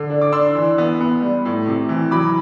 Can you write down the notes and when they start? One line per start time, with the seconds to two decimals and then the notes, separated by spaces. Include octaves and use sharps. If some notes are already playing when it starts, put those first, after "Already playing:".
Already playing: D3
0.10 D4
0.21 D6
0.32 D4 C6 E6
0.55 E3
0.78 B3
1.01 B3
1.22 G3
1.45 A2
1.68 C3
1.89 E3
2.11 F#3 B5 D6